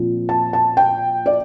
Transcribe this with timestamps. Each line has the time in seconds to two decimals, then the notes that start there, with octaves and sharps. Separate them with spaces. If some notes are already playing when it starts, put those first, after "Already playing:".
Already playing: A#2 F3 C4
0.29 A5
0.53 A5
0.77 G5
1.26 D5